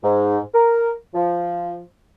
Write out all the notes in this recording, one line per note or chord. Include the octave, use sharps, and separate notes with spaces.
G#2
A#4
F3